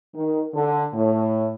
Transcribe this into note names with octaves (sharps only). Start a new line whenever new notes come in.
D#3
D3
A2